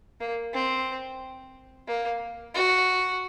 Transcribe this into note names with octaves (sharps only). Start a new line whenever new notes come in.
A#3
C4
A#3
F#4